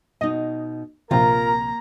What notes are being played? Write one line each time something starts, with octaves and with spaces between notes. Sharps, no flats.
B2 D#4 D#5
A#1 C3 A#3 F4 A#4 A#5